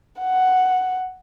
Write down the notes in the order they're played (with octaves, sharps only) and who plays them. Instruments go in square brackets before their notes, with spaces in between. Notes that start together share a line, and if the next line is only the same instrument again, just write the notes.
[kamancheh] F#5